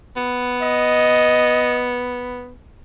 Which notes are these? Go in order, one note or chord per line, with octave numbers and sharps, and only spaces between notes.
B3
D#5